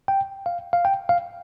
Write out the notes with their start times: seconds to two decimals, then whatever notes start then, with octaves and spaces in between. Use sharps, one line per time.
0.08 G5
0.46 F5
0.73 F5
0.85 G5
1.09 F5